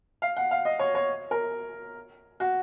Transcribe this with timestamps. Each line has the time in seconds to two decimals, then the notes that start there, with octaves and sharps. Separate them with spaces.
0.22 F5
0.37 F#5
0.51 F5
0.65 D#5
0.79 C#5
0.95 C#5
1.31 A#4
2.40 F#4